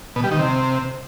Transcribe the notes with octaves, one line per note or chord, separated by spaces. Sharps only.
B2
G3
D#3
C3